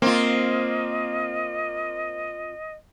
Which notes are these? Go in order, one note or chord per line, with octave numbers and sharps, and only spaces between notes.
A#3 C4 F4 D#5